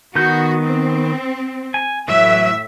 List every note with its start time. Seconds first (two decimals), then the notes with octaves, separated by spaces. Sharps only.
0.16 D#3 B3 F#4 G6
0.63 C4
1.74 G#5
2.08 A2 E3 F#3 E5